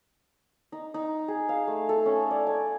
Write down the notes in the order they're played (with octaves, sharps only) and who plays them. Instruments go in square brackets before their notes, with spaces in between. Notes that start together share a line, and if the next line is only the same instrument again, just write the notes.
[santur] D#4
D#4
G#4
F5
A3
A4
C#4
D5
G#5